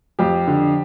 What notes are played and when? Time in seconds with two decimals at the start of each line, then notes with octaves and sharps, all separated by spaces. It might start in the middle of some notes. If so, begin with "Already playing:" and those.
0.19 F2 G4
0.47 D3